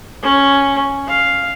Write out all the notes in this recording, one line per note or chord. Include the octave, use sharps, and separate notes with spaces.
C#4
F5